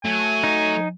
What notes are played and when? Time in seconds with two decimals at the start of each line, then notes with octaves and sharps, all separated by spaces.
0.05 F#3 A3 G#5
0.44 D#4